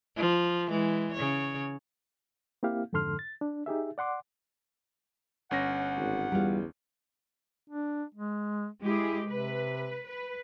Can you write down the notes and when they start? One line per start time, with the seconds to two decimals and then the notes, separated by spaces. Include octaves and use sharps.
0.16 F3
0.68 E3 G#3
1.14 C#3 C#5
2.63 A#3 C4 E4 G4 F5
2.93 F2 G#2 D3 A4 C6 F6
3.19 A6
3.41 D4
3.66 D#4 G4 G#4 E5
3.98 D5 F#5 C6 D6
5.51 G1 C#4 F#5 A#6
5.97 G#1
6.32 E2 G3 F4
7.70 D4
8.15 G#3
8.84 G#3 E4 G4 G#4
9.28 C3 B4
10.06 B4